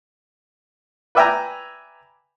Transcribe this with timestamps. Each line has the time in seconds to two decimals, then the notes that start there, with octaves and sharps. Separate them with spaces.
1.15 B4 D5 E5 G5 G#5 A#5